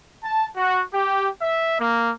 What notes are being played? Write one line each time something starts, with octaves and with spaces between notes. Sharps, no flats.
A5
F#4
G4
E5
A#3